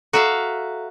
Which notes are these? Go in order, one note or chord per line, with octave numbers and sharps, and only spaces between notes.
F#4 A4 E5 F5 A#5